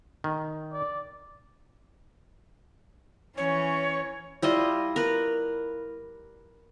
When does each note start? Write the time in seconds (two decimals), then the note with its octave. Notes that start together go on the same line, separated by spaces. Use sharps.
0.24 D#3
0.72 D5
3.37 E3 C#4 C#5
4.42 G3 E4 F4 D#5
4.96 A#4 B4